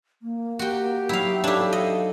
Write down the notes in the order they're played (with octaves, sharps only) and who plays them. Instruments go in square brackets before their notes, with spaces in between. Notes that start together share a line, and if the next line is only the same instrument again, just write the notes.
[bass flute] A#3
[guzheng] F#4 G5 [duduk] G4
[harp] F#3 B3 D#4 [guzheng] E4 F5
[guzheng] D4 E4 [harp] A4 B4 C#5 [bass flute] F5
[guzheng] D#5 [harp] A6 C7 C#7